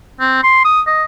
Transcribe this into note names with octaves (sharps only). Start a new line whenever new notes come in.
C4
C6
D#6
D#5